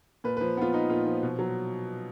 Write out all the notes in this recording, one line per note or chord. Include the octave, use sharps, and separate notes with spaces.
A#2 B4
B4
F3
B3 F4
D#4
A#2 F4
F3
B2
F#3